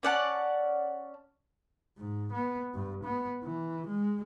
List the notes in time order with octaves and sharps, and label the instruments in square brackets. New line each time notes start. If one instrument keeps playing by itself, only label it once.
[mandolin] C#4 D5 F#5 A5
[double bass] G#2
B3
G2
B3
E3
G#3